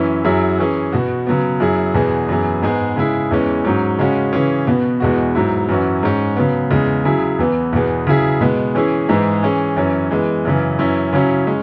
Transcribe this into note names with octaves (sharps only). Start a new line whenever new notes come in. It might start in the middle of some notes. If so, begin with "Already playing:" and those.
Already playing: F#2 E3 C#4 E4
F#2 F#3 E4 G#4
E3 C#4 G#4
B2 B3 F#4
C#3 F#3 B3
F#2 F#3 E4 G#4
E2 B2 B3 G#4
F#2 E3 B3 G#4
G#2 G#3 B3 G#4
C#3 G#3 E4 G#4
E2 E3 G#3 C#4
G#2 F#3 C#4
C#3 G#3 C#4 F#4
C#3 E3 C#4 G#4
B2 B3 F#4
E2 B2 G#3 B3 F#4
G#2 F#3 E4
F#2 E3 C#4 F#4
G#2 G#3 C#4
C#3 F#3 B3
E2 C#3 G#3
C#3 F#3 E4 G#4
E2 E3 B3
E2 B2 B3 G#4
C#3 F#3 E4 G#4
B2 G#3 B3
E3 C#4 E4 G#4
G#2 E3 G#3 E4 G#4
E3 C#4 G#4
F#2 E3 C#4
E3 G#3 B3
F#2 C#3 E3
F#2 E3 C#4 E4
C#3 F#3 C#4 E4
G#3 C#4